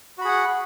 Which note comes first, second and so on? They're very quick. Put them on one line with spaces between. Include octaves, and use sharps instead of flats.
F#4 B5 G#4 F#5